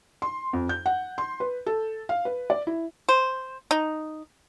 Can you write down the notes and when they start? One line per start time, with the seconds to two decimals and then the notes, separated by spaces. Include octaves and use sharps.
0.22 C6
0.53 F2
0.69 G6
0.86 F#5
1.18 C6
1.40 B4
1.66 A4
2.09 F5
2.25 B4
2.50 D5
2.67 E4
3.09 C5
3.71 D#4